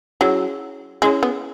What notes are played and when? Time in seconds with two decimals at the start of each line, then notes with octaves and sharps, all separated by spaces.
0.21 F#3 C#4 E4 G#4 C#5
1.02 G#3 C#4 E4 G#4 C#5
1.23 B3